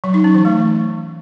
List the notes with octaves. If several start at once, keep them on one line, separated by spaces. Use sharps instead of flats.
F#3
D#4
C#4
E3
A3